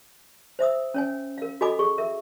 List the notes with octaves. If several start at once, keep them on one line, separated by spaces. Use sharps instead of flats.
C5 E5 D#6 E6
C#4 C#5 G#5
A#4 F5
F#4 A4 D#5 G#5 B5 D6
G#4 C#6
A#4 E5